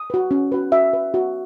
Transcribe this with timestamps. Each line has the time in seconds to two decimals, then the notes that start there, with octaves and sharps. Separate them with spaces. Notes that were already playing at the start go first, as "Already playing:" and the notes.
Already playing: D#6
0.10 F#4 B4
0.31 C#4
0.52 F#4 B4
0.72 F#4 E5
0.93 B4
1.14 F#4